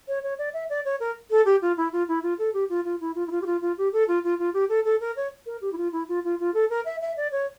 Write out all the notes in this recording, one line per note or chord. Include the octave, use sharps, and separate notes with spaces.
C#5
C#5
D5
E5
D5
C#5
A#4
A4
G4
F4
E4
F4
E4
F4
A4
G4
F4
F4
E4
F4
E4
F4
G4
F4
F4
G4
A4
F4
F4
F4
G4
A4
A4
A#4
C#5
A#4
G4
E4
F4
E4
F4
F4
F4
A4
A#4
E5
E5
D5
C#5